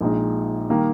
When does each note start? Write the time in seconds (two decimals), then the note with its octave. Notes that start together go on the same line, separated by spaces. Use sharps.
0.01 A#1 A#2 G#3 D#4
0.70 D#3 G3 A#3